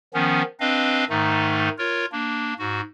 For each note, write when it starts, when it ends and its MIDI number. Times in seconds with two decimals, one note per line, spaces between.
0.14 0.42 51
0.14 0.42 53
0.14 0.42 59
0.14 0.42 61
0.60 1.05 60
0.60 1.05 62
0.60 1.05 71
0.60 1.05 75
0.60 1.05 77
1.09 1.69 44
1.09 1.69 51
1.09 1.69 57
1.09 1.69 63
1.78 2.05 65
1.78 2.05 70
1.78 2.05 73
2.12 2.53 58
2.12 2.53 62
2.59 2.81 44
2.59 2.81 66